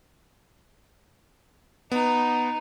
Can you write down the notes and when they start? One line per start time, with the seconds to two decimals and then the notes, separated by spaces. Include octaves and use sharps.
1.92 B3 D#4